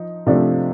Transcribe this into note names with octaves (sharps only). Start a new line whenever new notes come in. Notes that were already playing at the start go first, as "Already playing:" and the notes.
Already playing: F3 D#4
C3 F3 A3 D4